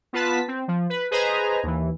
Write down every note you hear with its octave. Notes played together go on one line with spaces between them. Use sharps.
B3 F4 B4 A5 B6
C4
F3
B4
G#4 B4 C5 D#5 G#5 A#5
D#2 E3